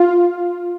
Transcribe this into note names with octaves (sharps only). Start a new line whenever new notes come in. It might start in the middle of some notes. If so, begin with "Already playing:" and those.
Already playing: F4